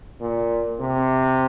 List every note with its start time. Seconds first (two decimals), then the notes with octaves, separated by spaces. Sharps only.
0.21 A#2
0.80 C3